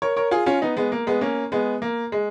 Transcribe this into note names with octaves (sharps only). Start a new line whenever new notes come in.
A#4 C#5
A#4 C#5
F4 G#4
C#4 F4
B3 D#4
G#3 B3
A#3
G#3 B3
A#3 C#4
G#3 B3
A#3
G#3